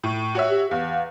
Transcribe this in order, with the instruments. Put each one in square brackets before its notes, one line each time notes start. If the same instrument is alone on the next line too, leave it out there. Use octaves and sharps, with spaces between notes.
[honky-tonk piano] A2
F#4 C#5 E5
[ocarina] G4
[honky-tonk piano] E2 [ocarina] F5